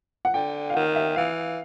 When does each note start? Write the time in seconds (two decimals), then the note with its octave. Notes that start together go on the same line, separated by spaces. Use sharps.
0.25 F#5
0.34 D3 G5
0.70 F5
0.75 D#3 F#5
0.96 E5
1.16 E3 F5